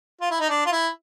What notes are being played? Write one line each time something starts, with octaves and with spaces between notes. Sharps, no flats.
F4
E4
D#4
D4
F4
E4